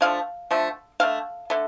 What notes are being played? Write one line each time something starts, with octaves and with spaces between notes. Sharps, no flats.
D3 F3 A3 F5
D3 F3 A3
D3 A3 F5
D3 A3